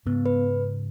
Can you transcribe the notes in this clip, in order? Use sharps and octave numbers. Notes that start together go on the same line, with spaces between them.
G#2 C#3 B3
B4